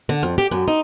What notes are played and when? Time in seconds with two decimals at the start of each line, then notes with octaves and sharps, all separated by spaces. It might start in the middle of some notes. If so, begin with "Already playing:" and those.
0.09 D3
0.23 F2
0.38 G4
0.51 F#2
0.68 D#4